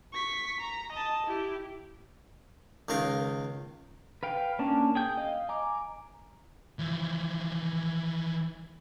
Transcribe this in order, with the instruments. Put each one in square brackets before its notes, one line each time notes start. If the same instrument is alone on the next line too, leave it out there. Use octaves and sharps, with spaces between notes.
[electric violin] C#6 B6
A#5
D#5 A5
E4 G4
[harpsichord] C#2 D#3 A#4 F5
[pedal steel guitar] B4 F5 G5
A#3 C#4 D4 A5
G#4 G5 G6
D#5 F5
G#5 A#5 D6
[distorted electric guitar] E3 F3